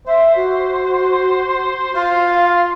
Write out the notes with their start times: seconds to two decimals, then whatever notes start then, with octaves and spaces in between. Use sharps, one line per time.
0.07 C5 E5
0.36 F#4
1.95 F4 F5